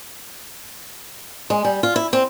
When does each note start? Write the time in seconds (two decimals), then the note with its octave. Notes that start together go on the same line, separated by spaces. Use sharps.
1.50 G#3
1.65 G3
1.83 F4
1.96 E4
2.13 C4